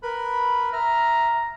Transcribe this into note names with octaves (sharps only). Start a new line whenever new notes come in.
A#4 B4 B5
E5 A#5 F6